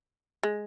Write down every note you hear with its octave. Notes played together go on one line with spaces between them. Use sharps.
G#3